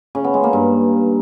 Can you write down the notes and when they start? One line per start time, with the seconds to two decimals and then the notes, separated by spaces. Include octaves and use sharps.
0.15 C#3
0.24 B3
0.34 G#3
0.43 A#3
0.53 G2